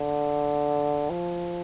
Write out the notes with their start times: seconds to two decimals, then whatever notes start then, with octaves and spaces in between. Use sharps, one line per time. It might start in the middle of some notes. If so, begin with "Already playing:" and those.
Already playing: D3
1.10 F3